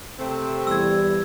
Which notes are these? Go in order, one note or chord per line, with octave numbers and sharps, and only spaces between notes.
C3 A3 C4
E2 G3 E6 G#6